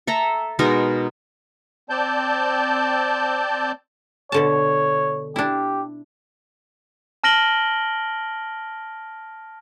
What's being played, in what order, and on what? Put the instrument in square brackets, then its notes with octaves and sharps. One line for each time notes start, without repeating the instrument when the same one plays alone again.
[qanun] A4 E5 A#5
B2 G#3 D#4 A#4
[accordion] C4 D5 A5 G6
[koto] B2 D3 A5 [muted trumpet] C#5
[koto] D4 E4 [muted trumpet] G4
[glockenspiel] A5 F6 A#6 D7 F#7 G7